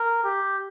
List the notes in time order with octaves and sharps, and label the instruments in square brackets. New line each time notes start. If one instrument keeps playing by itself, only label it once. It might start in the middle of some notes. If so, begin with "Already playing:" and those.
Already playing: [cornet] A#4
G4